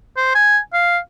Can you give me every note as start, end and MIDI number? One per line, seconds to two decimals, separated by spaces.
0.17 0.30 72
0.35 0.59 80
0.73 0.98 77